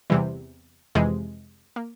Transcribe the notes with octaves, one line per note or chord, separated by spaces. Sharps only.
E2 C3 E3 G3
F2 C3 E3 G#3
A#3